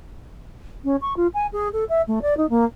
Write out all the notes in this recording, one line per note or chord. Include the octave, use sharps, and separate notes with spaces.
C#4
C#6
F4
G#5
G#4
A4
E5
A3
D5
D#4
A#3